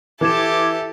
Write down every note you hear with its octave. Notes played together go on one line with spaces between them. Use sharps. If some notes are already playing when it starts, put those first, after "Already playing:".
E3 G4 A4 E5 D6 G#6 E7